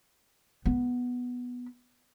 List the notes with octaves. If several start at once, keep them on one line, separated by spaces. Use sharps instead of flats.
B3